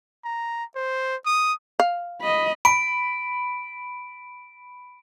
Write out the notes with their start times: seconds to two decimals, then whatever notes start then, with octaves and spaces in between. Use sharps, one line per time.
0.25 A#5
0.76 C5
1.26 D#6
1.80 F5
2.21 D#5 B5
2.65 B5 D7